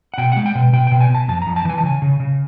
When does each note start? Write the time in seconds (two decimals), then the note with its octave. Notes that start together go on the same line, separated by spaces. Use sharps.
0.14 F#5
0.18 B2 G5
0.32 G#3 F#5
0.46 G5
0.55 B2
0.73 B2 G5
0.87 B2 G5
1.01 G#5
1.10 B2 A5
1.28 F2 A5
1.42 F2 A#5
1.56 A5
1.65 E3 G#5
1.78 A5
1.83 C#3 G#5
2.02 C#3
2.20 C#3